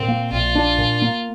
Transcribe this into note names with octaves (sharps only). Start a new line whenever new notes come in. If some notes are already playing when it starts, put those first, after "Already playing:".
Already playing: A#2 C4
A#3
A#1 F4
D4
A#2
A#3